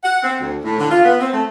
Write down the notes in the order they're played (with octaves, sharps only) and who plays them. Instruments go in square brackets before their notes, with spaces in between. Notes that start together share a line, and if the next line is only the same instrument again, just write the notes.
[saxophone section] F#5
C4
D2
A2
D3
F4
B3
C4
A3